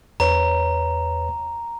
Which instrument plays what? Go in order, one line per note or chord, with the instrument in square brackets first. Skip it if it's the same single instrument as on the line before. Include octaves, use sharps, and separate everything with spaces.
[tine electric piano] E2 B4 C#5 [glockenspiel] A#5